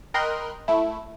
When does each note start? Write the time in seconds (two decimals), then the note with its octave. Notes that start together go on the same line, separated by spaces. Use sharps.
0.14 A#4 D#5 G5 B5 C6 F#6
0.68 A3 E4